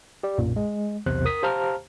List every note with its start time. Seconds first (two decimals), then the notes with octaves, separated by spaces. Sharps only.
0.23 G4 D5
0.38 B1 F#2 A#2
0.56 G#3
1.06 B1 E2 C3 C5 F#6
1.25 A#4 D#6 B6
1.43 G4 C5 F5 A5 A#5 F6